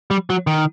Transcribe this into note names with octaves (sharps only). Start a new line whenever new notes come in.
G3
F#3
D#3